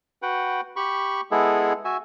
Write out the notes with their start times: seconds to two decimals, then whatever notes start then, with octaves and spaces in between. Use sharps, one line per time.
0.22 F#4 B4 F#5 G5
0.76 G4 B5 C#6
1.31 G#3 B3 E4 G#4 A4
1.85 F#4 E5 G#5